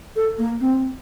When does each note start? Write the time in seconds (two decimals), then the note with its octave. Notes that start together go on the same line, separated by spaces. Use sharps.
0.16 A4
0.38 A#3
0.61 C4